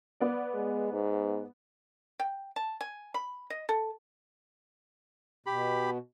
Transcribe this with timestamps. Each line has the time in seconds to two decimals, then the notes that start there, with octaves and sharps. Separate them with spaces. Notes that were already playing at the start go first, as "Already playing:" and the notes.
0.20 B3 D5
0.54 G#3
0.92 G#2
2.20 G5
2.56 A5
2.81 G#5
3.14 B5
3.50 D#5
3.69 A4
5.46 B2 G4 B5